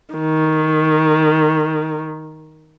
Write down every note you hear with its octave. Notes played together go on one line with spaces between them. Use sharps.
D#3